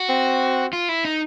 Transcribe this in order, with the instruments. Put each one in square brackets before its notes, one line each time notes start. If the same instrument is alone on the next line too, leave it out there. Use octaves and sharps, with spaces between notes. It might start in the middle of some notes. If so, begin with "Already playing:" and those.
Already playing: [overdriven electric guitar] F#4
[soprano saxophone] C4
[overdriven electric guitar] F4
E4
D#4